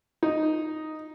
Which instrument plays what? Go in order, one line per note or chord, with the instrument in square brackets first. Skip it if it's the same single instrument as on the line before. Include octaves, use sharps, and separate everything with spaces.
[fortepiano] D#4